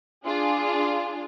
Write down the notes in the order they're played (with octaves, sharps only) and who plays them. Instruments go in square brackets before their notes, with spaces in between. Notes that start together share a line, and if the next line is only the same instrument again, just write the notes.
[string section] D4 F4 G#4